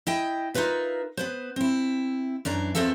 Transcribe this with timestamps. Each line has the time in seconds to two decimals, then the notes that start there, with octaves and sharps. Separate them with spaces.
0.07 E4 D#5 G5
0.54 D#4 F4 A#4 B4 E5
1.17 B3 B4 C5
1.56 C4 E4
2.45 F#2 E3 D4 A#5
2.75 E2 B3 C4 F4 A4 E5